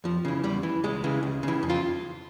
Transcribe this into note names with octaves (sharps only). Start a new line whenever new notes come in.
F2 F3
C#3 E3
E2 G3
E3
C#2 G#3
C#3 E3
C#2
C#3 E3
F2
F4